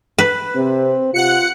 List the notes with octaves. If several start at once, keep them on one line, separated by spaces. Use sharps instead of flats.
B4
C3 C4
C3 F4 F#5 F#6 C#7